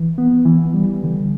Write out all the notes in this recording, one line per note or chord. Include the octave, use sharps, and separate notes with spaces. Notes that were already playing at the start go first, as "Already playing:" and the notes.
Already playing: E3
B3
E3
G3
D3